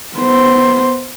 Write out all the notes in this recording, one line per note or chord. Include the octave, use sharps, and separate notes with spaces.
B3 C5